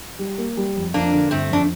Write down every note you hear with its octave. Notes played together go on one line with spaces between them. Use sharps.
G3
A#3
G3
F2
F2 A#3 D4
D3
G1 A3 C4
F2 D4